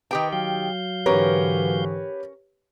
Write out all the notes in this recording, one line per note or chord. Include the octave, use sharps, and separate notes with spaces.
D#3 G4 B4 G5
F#3 F5 G6
G#2 D3 E3 C#4 G4 A#4 B4 C#5